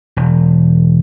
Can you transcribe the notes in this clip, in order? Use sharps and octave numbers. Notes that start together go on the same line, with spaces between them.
E1